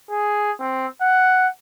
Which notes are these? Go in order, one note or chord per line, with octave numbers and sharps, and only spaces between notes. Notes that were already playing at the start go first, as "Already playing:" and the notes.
G#4
C4
F#5